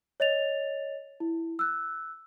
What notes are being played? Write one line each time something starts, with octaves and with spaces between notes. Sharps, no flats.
C#5 D#5 A6 F7
E4
E6 F#6